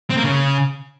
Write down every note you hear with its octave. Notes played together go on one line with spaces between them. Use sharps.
C4
A#3
C#3